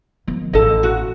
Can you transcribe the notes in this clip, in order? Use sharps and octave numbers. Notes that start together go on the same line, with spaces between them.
D#3 F3
A1 D#4 A4 D#5
F#4